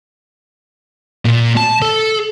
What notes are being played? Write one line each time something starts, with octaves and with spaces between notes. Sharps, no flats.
A#2
A5
A4